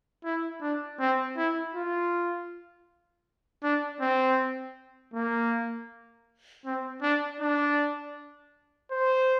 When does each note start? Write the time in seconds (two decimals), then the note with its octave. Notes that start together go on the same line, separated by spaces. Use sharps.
0.24 E4
0.61 D4
1.00 C4
1.37 E4
1.74 F4
3.63 D4
4.01 C4
5.14 A#3
6.65 C4
7.02 D4
7.40 D4
8.91 C5